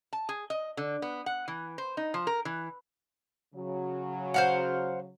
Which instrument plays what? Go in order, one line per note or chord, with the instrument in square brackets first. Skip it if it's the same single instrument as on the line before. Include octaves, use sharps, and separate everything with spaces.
[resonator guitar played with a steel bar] A5
G#4
D#5
D3
B3
F#5
E3
C5
D#4
F3
A#4
E3
[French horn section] C#3 F#3
[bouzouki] C5 F5 F#5